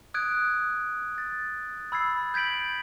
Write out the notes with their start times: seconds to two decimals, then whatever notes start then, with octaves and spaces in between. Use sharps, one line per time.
0.14 D#6 F#6 G#6 D7
1.18 A6
1.92 B5 E6 G#6 A6 C7
2.34 G6 G#6 B6 D7 F#7